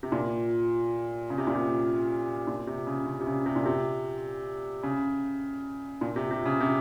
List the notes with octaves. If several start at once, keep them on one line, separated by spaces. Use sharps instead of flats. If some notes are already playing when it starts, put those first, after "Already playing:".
C3
A#2
C#3
C3
A#2
C3
A#2
C3
C#3
C#3
C3
C#3
C3
A#2
C3
C#3
A#2
C3
C3
C#3
C3